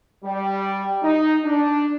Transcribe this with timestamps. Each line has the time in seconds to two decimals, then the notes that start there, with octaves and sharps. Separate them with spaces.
0.24 G3
1.03 D#4
1.44 D4